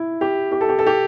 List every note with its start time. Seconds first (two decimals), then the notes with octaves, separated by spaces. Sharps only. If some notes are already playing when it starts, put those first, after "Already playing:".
Already playing: E4
0.21 G4
0.52 G4
0.61 A4
0.69 G4
0.79 A4
0.87 G4